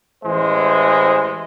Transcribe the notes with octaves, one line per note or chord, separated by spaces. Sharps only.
A1 E3 G#3 C5